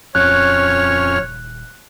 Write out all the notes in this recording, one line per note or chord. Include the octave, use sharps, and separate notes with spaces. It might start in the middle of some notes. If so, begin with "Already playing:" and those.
D#1 F2 C#4 C#5 F6 F#6